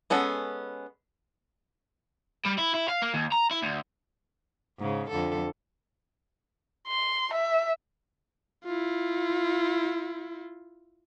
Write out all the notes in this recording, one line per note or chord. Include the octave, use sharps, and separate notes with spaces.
G#3 B3 C#4 A4
G3
E4
E4
F5
A#3
D#2
A#5
E4
D2
G#2 C#3
F2 D3 A4
C6
E5
E4 F4